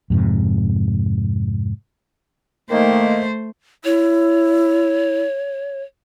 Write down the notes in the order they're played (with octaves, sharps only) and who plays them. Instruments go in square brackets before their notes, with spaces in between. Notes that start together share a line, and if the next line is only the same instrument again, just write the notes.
[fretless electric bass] F2 G#2 C3
[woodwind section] D#3 A#3 [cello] A3 C5
[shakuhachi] E4 [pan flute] C#5